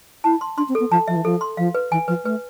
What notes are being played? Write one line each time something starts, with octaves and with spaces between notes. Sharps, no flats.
E4 A5
C6
D4 C6
C4
A4
B3
F3 A5
F3 E5
E3
F3 A4
C6
F3 F5
B4
E3 G#5
F3 B4
A3 B4